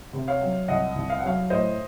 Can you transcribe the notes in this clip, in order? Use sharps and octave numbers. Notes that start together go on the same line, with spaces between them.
C3
C#5 F5
F#3
C2 D#5 F#5
C2
F5
F#5
F#3 C#5 F5
A2 C5 D#5